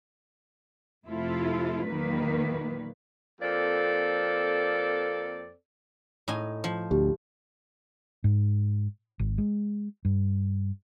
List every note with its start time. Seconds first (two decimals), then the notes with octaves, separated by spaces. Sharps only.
1.05 F2 C3 A3 E4 F4 A4
1.86 E2 A#2 D#3 F#3 A#3 B4
3.41 F2 A#3 C4 A4 D5
6.28 A2 D#4 G#5
6.64 F3
6.91 D2 G4
8.24 G#2
9.19 G#1
9.38 G#3
10.05 G2